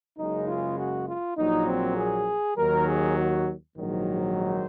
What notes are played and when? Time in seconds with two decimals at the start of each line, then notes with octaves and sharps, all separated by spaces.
0.17 F#1 F#2 C#3 G#3 D#4
0.47 F4
0.78 F#4
1.08 F4
1.37 A#1 A#2 F#3 D#4
1.67 C4
1.97 G#4
2.57 D#2 D#3 F#3 A#4
2.88 G#4
3.18 F#4
3.77 A#1 G#2 D#3 F#3
4.38 C5